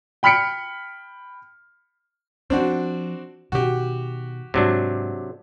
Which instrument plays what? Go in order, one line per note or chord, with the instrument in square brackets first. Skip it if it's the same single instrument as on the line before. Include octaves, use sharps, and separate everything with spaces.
[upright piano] G5 B5 F6 B6 C#7 D7
[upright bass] F3 [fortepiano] C4 D4 F#4
[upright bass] B2 D#3 [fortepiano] F#4 G4
[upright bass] G#2 G#3 [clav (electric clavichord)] C3 F#3 D4